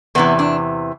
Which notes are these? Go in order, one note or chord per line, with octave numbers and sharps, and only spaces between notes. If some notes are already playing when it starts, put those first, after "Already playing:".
E2 C3 E3 B3
D4